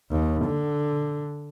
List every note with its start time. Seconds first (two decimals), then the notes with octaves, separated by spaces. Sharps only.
0.12 D#2
0.46 D3